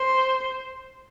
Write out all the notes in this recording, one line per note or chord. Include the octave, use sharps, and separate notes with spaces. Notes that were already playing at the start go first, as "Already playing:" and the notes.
Already playing: C5